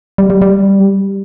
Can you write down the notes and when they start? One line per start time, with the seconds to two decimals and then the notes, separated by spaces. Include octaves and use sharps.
0.18 G3
0.30 G3
0.42 G3